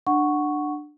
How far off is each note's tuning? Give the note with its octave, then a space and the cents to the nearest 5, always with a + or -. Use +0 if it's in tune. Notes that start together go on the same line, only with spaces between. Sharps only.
D4 +20 F#5 +0 C#6 +0